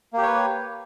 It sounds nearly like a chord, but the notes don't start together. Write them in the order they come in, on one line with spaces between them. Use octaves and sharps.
A#3 G4 C#5 B4